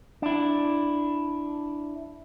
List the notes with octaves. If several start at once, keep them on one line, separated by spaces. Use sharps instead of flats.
D4 E4